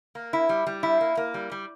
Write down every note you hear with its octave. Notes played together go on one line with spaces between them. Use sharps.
A#3
E4
G3
G3
E4
A#3
A#3
G3
G3